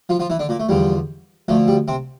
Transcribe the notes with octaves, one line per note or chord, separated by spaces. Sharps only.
F3 F4
F3 F4
E3 E4
D3 D4
A#2 A#3
A3
E2 D3 F3 G3
D2 D3 F3 A3
G3
C3 C4